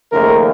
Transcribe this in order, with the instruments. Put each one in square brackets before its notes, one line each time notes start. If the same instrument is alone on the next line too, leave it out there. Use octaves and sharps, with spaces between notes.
[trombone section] D#2 C#3 F3 A3 A#4